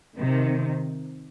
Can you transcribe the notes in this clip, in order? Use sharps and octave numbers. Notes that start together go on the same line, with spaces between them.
C3 D#3